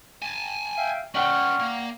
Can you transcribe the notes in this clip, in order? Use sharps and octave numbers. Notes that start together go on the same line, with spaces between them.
G#5 A5
E5 F5 G5
C#4 B4 D5 F#5 G5 C#6 F6
A#3